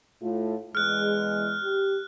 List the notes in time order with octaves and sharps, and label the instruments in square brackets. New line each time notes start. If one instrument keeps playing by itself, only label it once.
[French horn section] A2 A3 F4
[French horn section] E2 G#3 [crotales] F6 F#6
[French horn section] G4